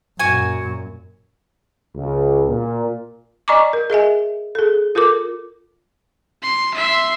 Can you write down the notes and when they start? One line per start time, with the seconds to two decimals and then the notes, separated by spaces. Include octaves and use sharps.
0.19 F#2 A#2 F#4 G#5
1.95 C#2
2.48 A#2
3.48 D5 D#5 G#5 A#5 C#6 D6
3.73 A#4
3.90 G#4 D#5 E5 G#5
4.55 G#4 A4
4.95 F4 A4 A#4 D6
6.43 C6
6.75 E5 C6